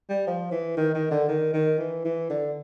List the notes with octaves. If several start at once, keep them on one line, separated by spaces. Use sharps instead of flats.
G3
F3
E3
D#3
D#3
D3
D#3
D#3
E3
E3
D3